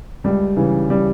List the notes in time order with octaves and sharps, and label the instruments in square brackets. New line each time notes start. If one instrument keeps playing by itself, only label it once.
[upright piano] C#2 [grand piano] G3
[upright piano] C#3 E3
[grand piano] G3